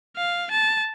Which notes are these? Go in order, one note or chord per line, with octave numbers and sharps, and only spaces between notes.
F5
A5